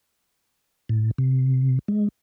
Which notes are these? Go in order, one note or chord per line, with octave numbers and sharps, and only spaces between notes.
A2
C3
G#3